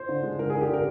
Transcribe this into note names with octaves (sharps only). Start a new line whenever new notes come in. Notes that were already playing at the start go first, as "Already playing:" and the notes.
Already playing: C5
D3
G#3
D3 A#4
D3 G#4
G4
D3 A#4